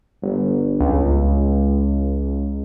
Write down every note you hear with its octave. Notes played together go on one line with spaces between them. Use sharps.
G1
C#2